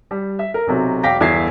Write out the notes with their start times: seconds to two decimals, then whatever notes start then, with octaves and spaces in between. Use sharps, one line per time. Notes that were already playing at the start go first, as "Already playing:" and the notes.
0.11 G3
0.39 E5
0.54 A#4
0.67 B1 C3 F#3
1.03 E1 F5 G5 D6 A#6 B6
1.20 G1 E2 E4 E5 G#6 C7